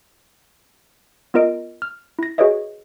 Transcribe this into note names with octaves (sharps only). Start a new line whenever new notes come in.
B3 F4 A#4 D#5 D7
F6
E4 A#6
F#4 G#4 B4 C#5 D#5 E5